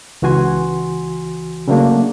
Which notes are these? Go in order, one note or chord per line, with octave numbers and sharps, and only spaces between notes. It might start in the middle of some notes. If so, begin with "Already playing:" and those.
C#2 E3 F#4 G#5 C6
C#3 F#3 A3 A#3 D4